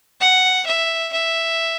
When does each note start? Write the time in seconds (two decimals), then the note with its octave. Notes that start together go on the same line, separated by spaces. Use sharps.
0.21 F#5
0.66 E5
1.13 E5